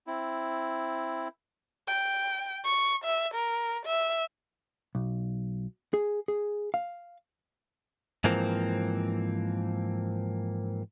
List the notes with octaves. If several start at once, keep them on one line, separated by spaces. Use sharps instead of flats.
C4 E4
G5
C#6
E5
A#4
E5
B1
G#4
G#4
F5
G#2 E3 F3 A#3 C4